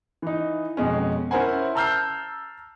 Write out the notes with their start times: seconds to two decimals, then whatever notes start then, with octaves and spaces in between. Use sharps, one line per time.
0.22 E3 D#4
0.77 F2 B2 G#3 C#4
1.31 C#4 E4 A#4 C5 F#5 G#5
1.75 A5 A#5 E6 F6 G6 C7